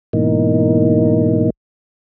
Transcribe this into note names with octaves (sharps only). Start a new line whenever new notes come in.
G#2 B2 E3 A#3 D#4